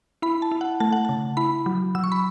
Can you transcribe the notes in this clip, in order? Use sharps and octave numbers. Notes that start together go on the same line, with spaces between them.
E4 B5
A5
E4
F#5
A3 A5
F#5
C#3 A5
E4 B5
F#3
F#3 E6
C#6
B5